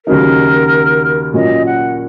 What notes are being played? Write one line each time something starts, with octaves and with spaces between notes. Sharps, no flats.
D#2 C#3 F#3 D#4 A#4
A#2 F#3 C#4 D#5
F#5